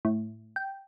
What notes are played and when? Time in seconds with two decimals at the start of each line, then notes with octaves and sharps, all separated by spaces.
0.05 A2
0.56 G5